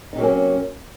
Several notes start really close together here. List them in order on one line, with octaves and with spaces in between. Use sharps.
D#4 C3 F#3 A#3 C#4